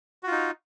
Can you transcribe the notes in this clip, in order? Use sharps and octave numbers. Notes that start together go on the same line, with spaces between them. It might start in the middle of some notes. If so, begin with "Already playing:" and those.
D#4 F4 F#4